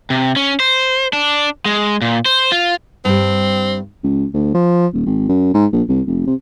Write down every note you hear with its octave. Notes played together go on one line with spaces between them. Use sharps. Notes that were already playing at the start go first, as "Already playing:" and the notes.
C3
C#4
C5
D4
G#3
A#2
C5
F4
G2 G3 C4
C#2
D2
F3
D#1
G#1
F#2
G#2
A#1
C2
F1
C3